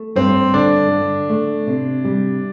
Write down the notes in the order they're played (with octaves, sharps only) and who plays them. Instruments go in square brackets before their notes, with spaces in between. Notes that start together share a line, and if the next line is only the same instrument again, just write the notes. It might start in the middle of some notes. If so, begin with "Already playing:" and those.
Already playing: [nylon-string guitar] A3
[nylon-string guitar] G2 [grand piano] C4
[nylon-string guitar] D3 [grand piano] D4
[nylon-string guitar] D3
A3
C3
G3